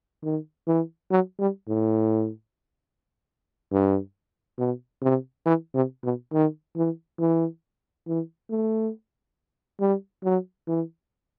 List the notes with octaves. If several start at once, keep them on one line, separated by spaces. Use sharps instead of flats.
D#3
E3
F#3
G3
A2
G2
B2
C3
E3
C3
B2
D#3
E3
E3
E3
A3
G3
F#3
E3